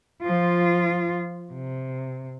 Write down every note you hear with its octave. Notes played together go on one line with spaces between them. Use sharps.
F3 F4
C3